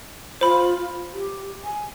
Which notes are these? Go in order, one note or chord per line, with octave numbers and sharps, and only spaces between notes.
F4 C5 B5
G4
G#5